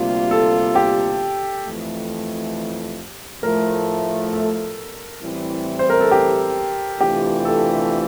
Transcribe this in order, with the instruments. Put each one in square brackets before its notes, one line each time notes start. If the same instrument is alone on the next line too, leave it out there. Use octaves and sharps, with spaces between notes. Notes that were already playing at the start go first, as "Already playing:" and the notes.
Already playing: [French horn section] D2 C3 G3 A#3 F4
[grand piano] A4
G4
[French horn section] F2 E3 A3
[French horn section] A2 F3 A3 [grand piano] A#4
[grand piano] A4
[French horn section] A2 E3 G3 C4 E4
[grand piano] C5
A#4
A4
G4
[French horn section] C3 E3 A3 D4 F4 [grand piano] G4
[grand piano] A4